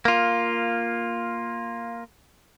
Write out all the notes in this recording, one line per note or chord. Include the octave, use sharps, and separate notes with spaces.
A#3 F4